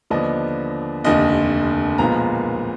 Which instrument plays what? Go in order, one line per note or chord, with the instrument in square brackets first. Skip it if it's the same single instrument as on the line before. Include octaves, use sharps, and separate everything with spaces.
[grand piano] D#2 D3 F3 B3 D4 D#5
F1 D#2 D3 D#5
B1 A#2 F3 G#3 B3 A#5